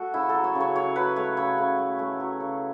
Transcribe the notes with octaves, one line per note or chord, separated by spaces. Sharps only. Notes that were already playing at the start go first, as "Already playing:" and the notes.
Already playing: A3 F#4 A4
C#3 E4
F#3 A4
C#5
C#3
C#5
C#3 C#5
F#3 B4
A3 C#5
C#3 C#5
C#3
A3
A3
F#3
C#3